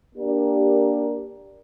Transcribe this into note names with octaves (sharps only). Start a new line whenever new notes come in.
A#3 D4 G4 A#4 D5